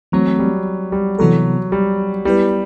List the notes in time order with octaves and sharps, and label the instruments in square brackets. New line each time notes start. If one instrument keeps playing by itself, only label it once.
[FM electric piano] E3 A3 C4 [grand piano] F#3
[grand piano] G3
G3
[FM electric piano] C3 E3 B3 F#4 A4 [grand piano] F#3
[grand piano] G3
[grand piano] G3 [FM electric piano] B3 E4 G4 B4